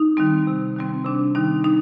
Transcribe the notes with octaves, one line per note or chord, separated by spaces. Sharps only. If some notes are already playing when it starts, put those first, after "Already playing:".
Already playing: D#4
D#3 G3 C4
C3
D#3 G3 C4
C3 D4
D#3 G3 C4 D#4
D#4